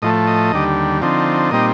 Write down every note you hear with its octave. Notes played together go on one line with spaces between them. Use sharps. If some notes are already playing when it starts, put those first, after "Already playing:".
A2 F3 A3 D#5
D#5
D#2 D3 G3
D3 F3 C4 D#4
A#2 G3 C4 D#4 D#5